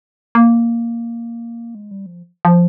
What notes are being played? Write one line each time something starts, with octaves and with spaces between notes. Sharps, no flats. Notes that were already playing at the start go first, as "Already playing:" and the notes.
A#3
G#3
G3
F3
F3